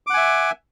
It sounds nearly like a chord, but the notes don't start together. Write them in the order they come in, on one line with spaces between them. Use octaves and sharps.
D6 F#5 G#5 E5